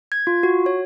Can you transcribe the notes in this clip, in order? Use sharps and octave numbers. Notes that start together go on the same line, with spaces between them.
G#6
F4
F#4
C#5